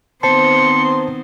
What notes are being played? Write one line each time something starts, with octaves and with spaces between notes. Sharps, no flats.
D#3 B3 C4 C5 A5 C6 C#7